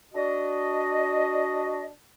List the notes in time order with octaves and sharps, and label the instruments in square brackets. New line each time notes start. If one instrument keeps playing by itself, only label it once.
[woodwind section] D4 F#4 D#5